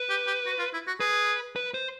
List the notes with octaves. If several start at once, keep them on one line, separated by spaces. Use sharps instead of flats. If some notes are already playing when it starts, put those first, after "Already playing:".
Already playing: B4
G4
G4
F#4
F4
E4
F#4
G#4 B4
B4
C5